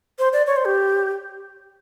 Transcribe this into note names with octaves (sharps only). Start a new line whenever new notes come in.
C5
D5
C#5
C5
G4